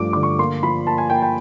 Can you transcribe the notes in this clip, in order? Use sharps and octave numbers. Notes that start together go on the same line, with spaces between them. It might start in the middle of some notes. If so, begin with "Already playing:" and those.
Already playing: G2 F3 A3 D6
D3 D6
C#6
A#3 C6
F3 B5
A#3 A5
G#5
A#3 G5
G5